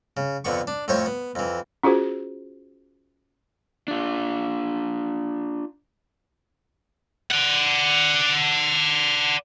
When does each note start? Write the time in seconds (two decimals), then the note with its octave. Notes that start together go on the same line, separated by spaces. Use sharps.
0.17 C#3
0.44 F2 D3 B3 C#6
0.67 D4
0.88 F2 A2 C5 C#5 C#6
1.06 B3
1.35 F2 E3
1.83 C#4 F4 F#4 G#4 C5
3.88 D4 F4
7.31 D5 F#5